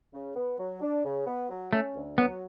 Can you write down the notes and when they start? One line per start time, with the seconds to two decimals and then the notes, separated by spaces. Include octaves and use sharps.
0.14 C#3
0.36 B3
0.59 F#3
0.81 D4
1.05 C#3
1.27 B3
1.50 F#3
1.73 A3 C#4
1.95 D2
2.18 F#3 B3